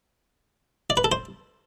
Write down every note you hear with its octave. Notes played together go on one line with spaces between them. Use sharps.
D5
B4
A4
C5